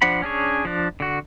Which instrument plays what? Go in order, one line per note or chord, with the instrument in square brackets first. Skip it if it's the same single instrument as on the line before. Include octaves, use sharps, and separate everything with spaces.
[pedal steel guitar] F3 D4 C5 F#5 B5
C#4 D4 G#4 C#5
F3 D4
D3 F#4